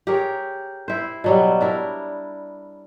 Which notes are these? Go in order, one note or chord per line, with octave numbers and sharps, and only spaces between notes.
G4 G#4 A#4 C#5
E4 C5
B2 F#3 G3
D4 E4 A#4